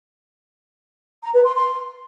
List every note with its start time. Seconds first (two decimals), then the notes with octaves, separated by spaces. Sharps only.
1.23 A#5
1.34 B4
1.44 C6
1.55 C6